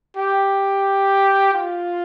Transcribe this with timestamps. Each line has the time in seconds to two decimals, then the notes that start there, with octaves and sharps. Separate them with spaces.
0.17 G4
1.54 F4